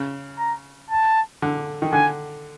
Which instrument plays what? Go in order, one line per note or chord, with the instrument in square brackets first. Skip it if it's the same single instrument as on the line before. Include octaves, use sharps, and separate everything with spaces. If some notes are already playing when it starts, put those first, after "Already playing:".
Already playing: [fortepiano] C#3
[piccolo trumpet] A#5
A5
[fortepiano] D3
D#3
[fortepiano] D3 [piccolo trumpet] G#5